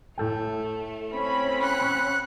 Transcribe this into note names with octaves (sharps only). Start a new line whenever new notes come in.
A2 A3 A4 G5
C4 C#4 B5
F#5 F#6